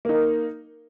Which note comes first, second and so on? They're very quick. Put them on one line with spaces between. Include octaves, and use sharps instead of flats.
A#3 D#4 A#4